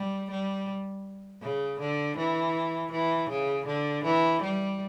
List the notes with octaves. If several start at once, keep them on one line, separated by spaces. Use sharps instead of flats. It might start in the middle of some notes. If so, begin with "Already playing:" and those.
Already playing: G3
G3
C#3
D3
E3
E3
C#3
D3
E3
G3